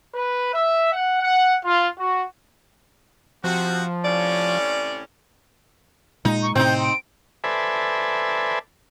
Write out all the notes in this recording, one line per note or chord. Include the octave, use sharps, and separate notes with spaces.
B4
E5
F#5
F#5
F4
F#4
C3 F3 C4 F#4
A2 C3 C#4 D5
A#2 G#3 D#4
C#6
A2 C3 C4 D#4 G6
D7
A4 B4 C5 D5 E5 G#5